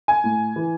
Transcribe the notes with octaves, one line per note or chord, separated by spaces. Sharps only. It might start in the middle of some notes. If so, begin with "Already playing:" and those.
G#5
A2
E3